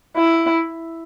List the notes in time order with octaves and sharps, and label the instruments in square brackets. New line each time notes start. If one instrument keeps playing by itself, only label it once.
[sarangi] E4